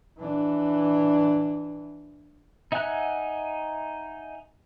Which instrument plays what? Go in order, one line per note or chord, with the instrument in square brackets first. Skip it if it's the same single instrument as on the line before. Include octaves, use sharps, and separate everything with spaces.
[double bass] E3 D4
[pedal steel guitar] D#4 E5 F#5 G#5 F#6